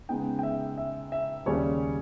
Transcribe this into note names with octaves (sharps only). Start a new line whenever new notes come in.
C#3 G#3 B3 D#4 G5
G5
E5
E5
E5
D#2 C#3 G3 C#4 C#5